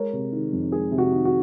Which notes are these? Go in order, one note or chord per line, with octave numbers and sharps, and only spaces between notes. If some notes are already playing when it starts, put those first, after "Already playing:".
Already playing: G#3 A#4 C#5
C3
D#3
F2
G#3 G#4
C3
F#4
D#3
F#4